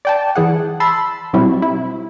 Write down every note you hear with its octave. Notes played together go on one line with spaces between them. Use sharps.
D5 G5 A5
E3 G#4 F#5
A5 B5 C6 E6
B2 F#3 G3 C4 E4
E4